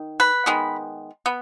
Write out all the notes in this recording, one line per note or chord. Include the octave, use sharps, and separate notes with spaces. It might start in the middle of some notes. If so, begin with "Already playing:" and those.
Already playing: D#3
B4
D#3 G#3 B3
B3